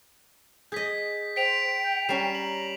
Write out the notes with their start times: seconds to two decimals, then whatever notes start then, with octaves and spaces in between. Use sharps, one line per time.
0.72 G#4 D#5 G6 B6
1.36 C5 G5 B6 D7 F7
1.83 G6
2.09 G3 C#4 A#5 C7 E7
2.35 F#7